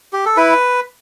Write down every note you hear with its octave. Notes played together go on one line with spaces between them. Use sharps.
G4
A4
E4 B4